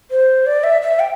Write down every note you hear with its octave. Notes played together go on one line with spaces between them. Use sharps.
C5
D5
E5
E5
G5